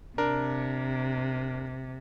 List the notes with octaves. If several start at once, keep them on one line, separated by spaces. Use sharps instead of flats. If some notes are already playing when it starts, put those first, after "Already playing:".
C3 D4 A#4